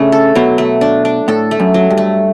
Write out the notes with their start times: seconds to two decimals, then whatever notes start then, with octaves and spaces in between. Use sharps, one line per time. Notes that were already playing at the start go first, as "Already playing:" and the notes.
Already playing: C#3 A3 D4
0.12 A4
0.35 B2 F#3
0.58 A3
0.81 D4
1.05 D4
1.28 A2 A4
1.51 A3
1.60 F#2
1.74 F#3
1.90 G2
1.98 A3